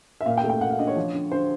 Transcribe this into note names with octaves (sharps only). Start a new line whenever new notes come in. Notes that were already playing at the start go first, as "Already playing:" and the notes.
E5
A#2 F5
G5
A3
G5
A#2 F#5
F5
D4 D#5
C#5
F3
D3
D3 C5